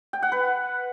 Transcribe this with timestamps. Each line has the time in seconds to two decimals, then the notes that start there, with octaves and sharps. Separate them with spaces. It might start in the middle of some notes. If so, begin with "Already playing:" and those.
0.13 G5
0.23 F#5
0.32 B4